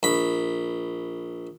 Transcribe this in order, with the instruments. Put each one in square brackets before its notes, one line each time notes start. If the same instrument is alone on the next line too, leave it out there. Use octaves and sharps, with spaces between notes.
[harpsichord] A#1 B5